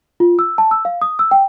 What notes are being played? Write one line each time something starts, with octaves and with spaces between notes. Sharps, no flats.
F4
E6
A5
E6
F5
D#6
E6
G5